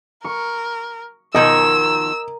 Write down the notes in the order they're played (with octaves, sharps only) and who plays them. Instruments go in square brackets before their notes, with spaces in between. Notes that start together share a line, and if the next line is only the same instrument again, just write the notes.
[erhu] A#4 [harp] C#6
[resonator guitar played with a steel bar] B2 D#3 F3 [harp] A#4 G#6 [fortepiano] D#5 [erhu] E6